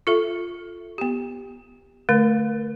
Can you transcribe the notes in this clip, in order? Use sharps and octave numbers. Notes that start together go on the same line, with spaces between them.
F4 A4 E5
B3 G4
D3 A3 A#4